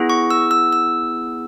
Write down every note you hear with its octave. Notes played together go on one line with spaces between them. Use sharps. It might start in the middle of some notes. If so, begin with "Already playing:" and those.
Already playing: B3 E4 G#4
C#6
E6
E6
E6